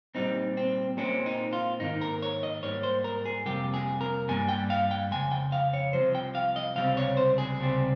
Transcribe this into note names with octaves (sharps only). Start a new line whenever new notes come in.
A#2 G3 C4 D#4
C4
A#2 G#3 C4 C#4
D#4
F4
G#2 D#3 A#3 D#4
A#4
C#5
D#5
G#2 G3 A#3 C#5
C5
A#4
G#4
F2 C3 G3 A#3 G4
G#4
A#4
G2 G3 A#3 G#5
G5
F5
G5
F2 C#3 G#3 G#5
G5
F5
C#5
C2 C3 F3 G#3 C5
G5
F5
D#5
C#2 C3 G3 C4 F5
C#5
C5
G#4
C#2 C3 G3 C4